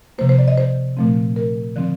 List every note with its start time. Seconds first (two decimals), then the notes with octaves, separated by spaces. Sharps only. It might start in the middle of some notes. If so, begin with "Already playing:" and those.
0.18 C3 F3 A#3 C5
0.29 C5
0.38 D5
0.48 D#5
0.57 C5
0.97 A#2 F3 A3 C4
1.36 A#4
1.76 D3 F3 C4